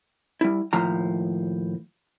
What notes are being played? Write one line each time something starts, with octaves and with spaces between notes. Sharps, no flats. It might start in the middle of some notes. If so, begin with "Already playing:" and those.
G3 E4
D#2 A2 F3 A#5